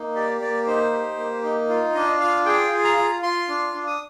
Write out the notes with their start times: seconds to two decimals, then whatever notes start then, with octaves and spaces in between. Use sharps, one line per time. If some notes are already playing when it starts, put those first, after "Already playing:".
Already playing: A#3 D#4
0.15 G4 D5
0.41 A#3 D5
0.67 D#4 C5
0.93 G4
1.17 A#3
1.44 D#4
1.69 F4
1.95 D4 D#5
2.20 F4 F5
2.45 G#4 G5
2.71 F4
2.84 A#5
2.97 F4
3.22 F4 C6
3.48 D4
3.74 D4
3.87 D#6